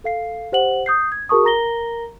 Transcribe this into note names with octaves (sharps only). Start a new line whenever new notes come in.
A4 F5 C7
G4 C5 F#5 F#7
D#6 G6 C7
G#6
F#4 G#4 A#4 A5 C#6 D#6
A#4 A#5 A#6 G7